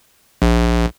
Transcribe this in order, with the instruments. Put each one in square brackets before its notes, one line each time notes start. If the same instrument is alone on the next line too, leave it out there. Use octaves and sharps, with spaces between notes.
[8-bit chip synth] A#1